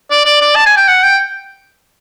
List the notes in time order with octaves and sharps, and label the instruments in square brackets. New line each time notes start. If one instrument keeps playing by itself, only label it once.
[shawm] D5
D5
D5
A5
G#5
G5
F#5
G5